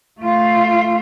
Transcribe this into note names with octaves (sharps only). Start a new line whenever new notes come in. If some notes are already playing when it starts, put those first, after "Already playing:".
A3 F4